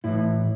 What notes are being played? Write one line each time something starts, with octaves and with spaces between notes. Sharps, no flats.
A2 E3 E4